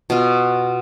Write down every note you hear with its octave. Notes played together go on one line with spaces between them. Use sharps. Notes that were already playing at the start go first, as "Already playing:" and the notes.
B2 F4